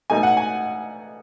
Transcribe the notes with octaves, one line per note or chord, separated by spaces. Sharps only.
B2 A3 D#4 G#5
F#5
G#5